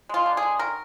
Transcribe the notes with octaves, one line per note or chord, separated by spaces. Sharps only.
G#3 F4
D3
G#4
G#3
D#3 A#4